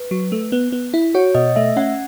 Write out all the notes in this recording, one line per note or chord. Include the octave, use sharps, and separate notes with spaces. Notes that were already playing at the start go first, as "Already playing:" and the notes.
Already playing: B4
F#3
A3
B3
B3
E4
F#4 C#5
B2 D#5
A3 E5
C#4 F#5